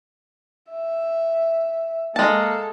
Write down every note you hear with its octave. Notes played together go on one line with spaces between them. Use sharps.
E5
G#3 A#3 A4 A5